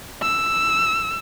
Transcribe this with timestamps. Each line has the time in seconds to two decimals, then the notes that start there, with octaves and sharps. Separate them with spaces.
0.22 E6